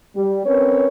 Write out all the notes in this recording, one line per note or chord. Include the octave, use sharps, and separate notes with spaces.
G3
C4 C#4 A#4 B4 C#5